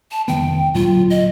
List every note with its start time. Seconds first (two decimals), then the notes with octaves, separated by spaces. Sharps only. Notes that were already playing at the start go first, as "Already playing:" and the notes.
0.12 A5
0.28 F1 D#3 B3 G5
0.75 D2 A#2 F#3 F4
1.10 D#5